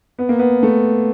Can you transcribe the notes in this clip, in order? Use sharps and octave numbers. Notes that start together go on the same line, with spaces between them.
B3
A#3
B3
A3